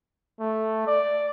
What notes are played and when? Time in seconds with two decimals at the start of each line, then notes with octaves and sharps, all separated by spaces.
0.40 A3
0.87 D5